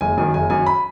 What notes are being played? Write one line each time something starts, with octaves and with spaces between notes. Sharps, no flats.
F#1 G#5
F#2 D#3 G#5
F#1 G#5
F#2 D#3 G#5
B5